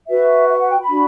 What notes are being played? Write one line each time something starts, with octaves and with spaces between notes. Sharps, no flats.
F#4 B4 E5
E5
F#5
G5
B5
D4 F#4